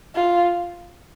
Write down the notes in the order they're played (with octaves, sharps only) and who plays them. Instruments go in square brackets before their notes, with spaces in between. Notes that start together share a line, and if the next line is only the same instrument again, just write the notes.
[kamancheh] F4